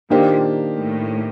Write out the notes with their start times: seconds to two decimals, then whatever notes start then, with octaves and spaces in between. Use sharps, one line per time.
0.10 A#2 D#3 A#3 D4 G4 C5
0.79 A2